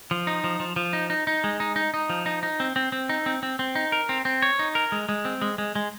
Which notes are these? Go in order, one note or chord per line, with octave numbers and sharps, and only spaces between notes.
F3
D#4
F3
F3
F3
D#4
D#4
D#4
G#3
D#4
D#4
D#4
F3
D#4
D#4
C4
C4
C4
D#4
C4
C4
C4
D#4
A#4
C4
C4
C#5
D#4
A#4
G#3
G#3
C4
G#3
G#3
G#3